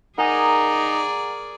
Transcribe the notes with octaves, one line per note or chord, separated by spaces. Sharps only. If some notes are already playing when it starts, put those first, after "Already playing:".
D#4 G#4 A#4 D5 F#5 G#5 D#6